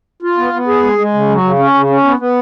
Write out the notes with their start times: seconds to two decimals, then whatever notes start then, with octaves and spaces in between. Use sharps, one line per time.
0.22 F4
0.37 B3
0.53 B3
0.68 G#4
0.83 G#3
0.98 G#3
1.14 C#3
1.29 F#3
1.44 C#3
1.59 C#4
1.74 C#3
1.90 C#4
2.04 B3
2.19 B3